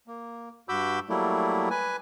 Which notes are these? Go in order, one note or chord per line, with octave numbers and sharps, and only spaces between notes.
A#3
G2 F#4 B5 D6 E6 G6
F#3 G3 A3 A#3 E4
B4 G#5